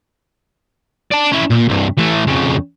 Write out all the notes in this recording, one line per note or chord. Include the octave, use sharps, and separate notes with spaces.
D5 A5
C#4 E4
A#2
C2 G2
E3 A3
F2 C#3